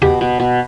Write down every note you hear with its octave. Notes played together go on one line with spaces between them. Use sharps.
B2 G4
B2
B2